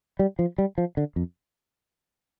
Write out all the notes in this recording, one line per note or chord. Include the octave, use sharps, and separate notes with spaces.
G3
F3
G3
F3
D3
F2